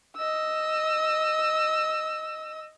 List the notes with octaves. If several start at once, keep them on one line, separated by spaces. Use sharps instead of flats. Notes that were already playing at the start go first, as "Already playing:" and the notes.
D#5 E6